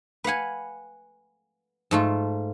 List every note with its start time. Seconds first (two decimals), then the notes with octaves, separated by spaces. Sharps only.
0.24 B4 F5 F#5 G#5
1.91 G#2 A3 F4